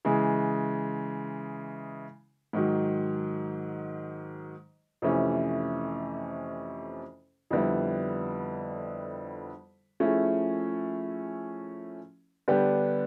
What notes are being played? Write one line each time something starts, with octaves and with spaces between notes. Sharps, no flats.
C#3 E3 G#3
G#2 D#3 F#3
F2 C3 E3 A3 C#4
F2 D3 G3 B3 E4
F3 A3 C#4 E4 G#4
D3 G3 B3 D4 G4